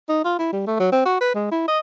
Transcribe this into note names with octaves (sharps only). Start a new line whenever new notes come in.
D#4
F4
E4
G3
A3
F#3
C4
F#4
B4
G#3
E4
D#5